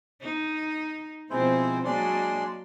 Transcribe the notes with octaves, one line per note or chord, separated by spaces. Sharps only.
D#4
B2 F3 G#3 C4 E4 C5
F#3 G#3 A#3 D4 D5 C6